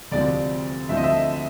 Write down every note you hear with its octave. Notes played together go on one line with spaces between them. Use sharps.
D2 C3 F3 G#3 C4 D5
D2 D3 F3 A3 C4 E5
D#5
E5